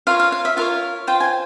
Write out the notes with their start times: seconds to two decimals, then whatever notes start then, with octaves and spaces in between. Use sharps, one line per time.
0.07 F4 A#4 C#5 F5
0.20 F5
0.32 F5
0.45 E5
0.57 F4 A#4 C#5 F5
1.07 F4 C5 G5
1.20 G#5